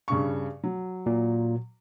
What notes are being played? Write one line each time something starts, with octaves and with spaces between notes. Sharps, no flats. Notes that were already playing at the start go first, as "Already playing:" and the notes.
G2 C#3 C#6
F#3
A#2